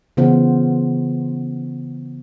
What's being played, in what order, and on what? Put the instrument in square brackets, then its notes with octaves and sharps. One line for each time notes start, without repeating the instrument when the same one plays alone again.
[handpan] C#3 E3 B3 F4 C5